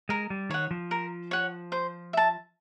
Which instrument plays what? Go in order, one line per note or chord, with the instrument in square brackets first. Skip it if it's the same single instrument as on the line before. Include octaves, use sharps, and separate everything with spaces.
[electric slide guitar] G#3 [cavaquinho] A#4
[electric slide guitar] G3
[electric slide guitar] D#3 [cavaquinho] C#5 F#5
[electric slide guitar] F3
[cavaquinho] A#4
C#5 F#5
C5
E5 A5